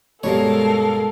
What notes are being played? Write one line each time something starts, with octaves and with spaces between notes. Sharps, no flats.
G2 B2 G3 G#3 A4 A#4 C#5 F5